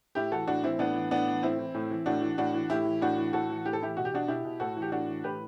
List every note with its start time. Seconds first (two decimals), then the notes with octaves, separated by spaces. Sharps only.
0.15 A2 E4 G4
0.32 E3 F#4 A4
0.47 A2 D4 F#4
0.63 E3 C4 E4
0.79 A2 B3 D4
0.95 E3
1.10 A2 B3 D4
1.27 E3
1.43 A2 C4 E4
1.58 E3
1.74 A2
1.91 E3
2.06 A2 D4 F#4
2.22 E3
2.38 A2 D4 F#4
2.54 E3
2.70 A2 E4 G4
2.85 E3
3.01 A2 D4 F#4
3.18 E3
3.33 A2 F#4 A4
3.50 E3
3.65 A2 G4
3.73 A4
3.81 E3 E4 G4
3.97 B2 F#4
4.05 G4
4.13 B2 D4 F#4
4.28 B2 E4 G4
4.45 B2
4.60 A2 F#4 A4
4.77 E3
4.82 G4
4.92 A2 D4 F#4
5.08 E3
5.24 A2 G4 B4